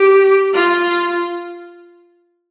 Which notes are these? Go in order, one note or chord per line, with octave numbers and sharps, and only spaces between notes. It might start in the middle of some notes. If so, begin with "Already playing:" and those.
Already playing: G4
F4